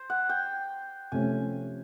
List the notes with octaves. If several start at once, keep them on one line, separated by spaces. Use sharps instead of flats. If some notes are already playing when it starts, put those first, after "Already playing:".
Already playing: C5
F#5
G5
C3 F3 A3 C#4 G#5